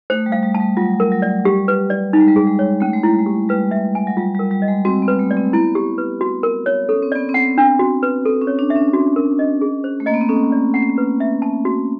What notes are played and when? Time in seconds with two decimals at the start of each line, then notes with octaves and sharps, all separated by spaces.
0.10 A3 C5
0.26 G3
0.32 F5
0.43 G3
0.55 A5
0.60 G3
0.77 F#3 F4
1.00 A#4
1.12 F#3
1.22 D5
1.45 G3 G4
1.68 B4
1.90 D5
2.13 G3 D#4
2.21 G#3
2.28 G3
2.36 G#4
2.47 G#3
2.59 C#5
2.81 A3 C#4
2.93 G#3
3.03 G3 E4
3.19 G#3
3.26 G4
3.49 G3 B4
3.71 E5
3.95 G#5
4.07 F#3
4.17 G3 F4
4.35 G3 A#4
4.51 G3
4.62 D#5
4.68 G#3
4.85 C4 F#4
5.02 B3
5.08 B4
5.19 A3
5.31 D5
5.37 C4
5.53 B3 E4
5.75 G4
5.98 B4
6.21 F#4
6.43 A#4
6.66 C#5
6.89 C#4 A4
7.02 C4
7.12 B3 D5
7.29 C4
7.34 F#5
7.58 D4
7.79 F#4
8.03 B4
8.25 C4 A4
8.42 C#4
8.47 C#5
8.59 D4
8.70 E5
8.76 C#4
8.93 F#4
9.16 A#4
9.39 D#5
9.61 G#4
9.84 C5
10.00 A3
10.06 A#3 D#5
10.14 B3
10.21 C4
10.29 C#4 A4
10.52 D5
10.74 F#5
10.98 B4
11.20 E5
11.42 A5
11.65 F#4